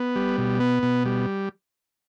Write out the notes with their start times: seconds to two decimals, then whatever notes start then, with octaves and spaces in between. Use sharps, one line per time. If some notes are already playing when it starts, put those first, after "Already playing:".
Already playing: B3
0.16 G3
0.38 B2
0.60 B3
0.83 B2
1.05 G3